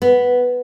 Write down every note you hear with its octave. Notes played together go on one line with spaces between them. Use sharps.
B3